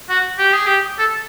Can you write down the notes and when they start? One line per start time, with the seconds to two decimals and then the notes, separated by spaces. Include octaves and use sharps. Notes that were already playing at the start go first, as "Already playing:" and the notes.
0.09 F#4
0.38 G4
0.53 G#4
0.66 G4
0.99 A4